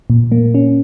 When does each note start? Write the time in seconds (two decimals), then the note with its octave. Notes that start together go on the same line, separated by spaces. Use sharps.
0.10 A#2
0.32 A#3
0.54 C#4